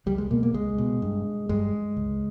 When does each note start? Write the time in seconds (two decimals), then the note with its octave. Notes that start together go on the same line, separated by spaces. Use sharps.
0.06 C#2 G3
0.18 G#3
0.31 B2 A#3
0.43 A#3
0.54 C#2 G#3
0.78 B2
1.02 G2
1.49 G2 G#3
1.96 C#2